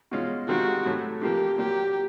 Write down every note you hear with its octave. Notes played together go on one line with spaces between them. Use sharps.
B2 G#3 C#4 F4
C3 D#3 G#3 C4 F4 F#4
A2 F#3 A3
C3 F3 A#3 G4
A#2 F#3 A#3 G4